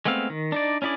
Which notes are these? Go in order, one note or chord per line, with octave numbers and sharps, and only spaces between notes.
G#3 A3 B3 C4 F5
D#3
D4 D#4 D5
C#4 D4 E4 G#4 D5